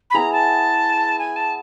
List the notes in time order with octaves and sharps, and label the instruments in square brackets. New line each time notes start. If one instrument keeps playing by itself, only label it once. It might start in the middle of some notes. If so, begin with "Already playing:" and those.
[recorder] B5
[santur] B3 E4 G#4 [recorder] A#5
[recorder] A5
G#5
A5